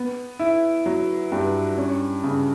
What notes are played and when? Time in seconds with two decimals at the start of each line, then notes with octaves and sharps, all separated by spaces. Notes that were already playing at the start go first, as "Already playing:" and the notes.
Already playing: B3
0.39 E4
0.86 F#3
1.32 G2
1.78 C#4
2.24 C#3